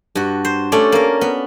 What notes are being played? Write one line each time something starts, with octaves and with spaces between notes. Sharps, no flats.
G2 F#4
C5
A3 C#4 D5
A#3 A#4
B3